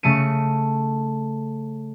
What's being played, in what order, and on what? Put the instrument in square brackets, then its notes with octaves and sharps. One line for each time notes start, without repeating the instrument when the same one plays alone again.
[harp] C#3 A3 C#7 D#7